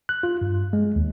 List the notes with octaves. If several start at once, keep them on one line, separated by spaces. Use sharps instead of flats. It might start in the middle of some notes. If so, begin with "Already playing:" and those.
F#6
F4
G2
G#3
D#2